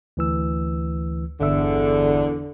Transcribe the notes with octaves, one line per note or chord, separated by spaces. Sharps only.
D2 E3 E6
G1 E2 D3 E5 E6